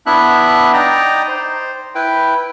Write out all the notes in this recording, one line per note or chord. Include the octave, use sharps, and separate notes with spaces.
B3 D4 E4 E5 F#6
D#4 D5 D#5 G5 A#5
C5
E4 B4 G5